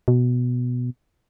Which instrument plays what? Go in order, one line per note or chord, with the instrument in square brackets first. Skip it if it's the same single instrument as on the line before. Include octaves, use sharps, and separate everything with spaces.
[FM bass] B2